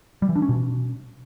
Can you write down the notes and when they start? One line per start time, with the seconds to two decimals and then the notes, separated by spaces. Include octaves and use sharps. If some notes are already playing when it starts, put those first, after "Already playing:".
0.22 G3
0.29 E3
0.36 D4
0.42 C#4
0.49 B2